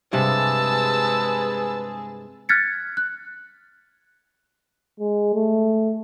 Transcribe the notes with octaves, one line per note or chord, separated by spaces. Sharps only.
G2 C3 G#3 G#4 B4 A5 E6
F6 F#6 G#6 A6 B6 C#7
F#6
G#3
A3